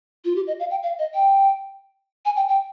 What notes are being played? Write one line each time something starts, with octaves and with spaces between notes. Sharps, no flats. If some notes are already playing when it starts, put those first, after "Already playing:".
F4
G4
D#5
F5
G5
F5
D#5
G5
G#5
G5
G5